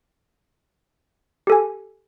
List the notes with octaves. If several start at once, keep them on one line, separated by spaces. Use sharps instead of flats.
G4 A4 G#5